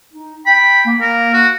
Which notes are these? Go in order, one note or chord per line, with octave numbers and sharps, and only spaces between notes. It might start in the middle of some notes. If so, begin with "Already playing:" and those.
D#4
G5 B5
A#3
A#4
F#4